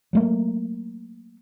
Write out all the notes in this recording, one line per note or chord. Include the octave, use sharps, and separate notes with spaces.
F#3 A3 A#3